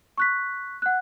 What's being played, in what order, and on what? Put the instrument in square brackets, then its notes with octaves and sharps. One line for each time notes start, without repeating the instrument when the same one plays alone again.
[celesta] C#6 F#6 B6
F#5 F#6